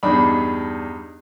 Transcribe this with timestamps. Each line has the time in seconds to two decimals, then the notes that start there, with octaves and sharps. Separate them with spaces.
0.03 E2 G2 D4 D#4 B5